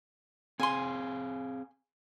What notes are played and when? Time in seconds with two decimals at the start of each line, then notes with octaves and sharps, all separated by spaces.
0.60 C4 G#4 F5 G#5 C6